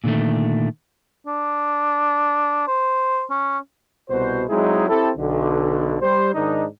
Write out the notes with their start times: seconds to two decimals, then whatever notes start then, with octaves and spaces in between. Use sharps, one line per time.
0.04 A#2 D3 D#3 A3
1.27 D4
2.67 C5
3.30 C#4
4.10 C2 B2 F#4 C5
4.49 F#3 G#3 C4 D#4 E4 G#4
4.89 C4 E4 G4 A4
5.17 B1 D3
6.02 G3 C5
6.34 G#2 D#3 D4 D#4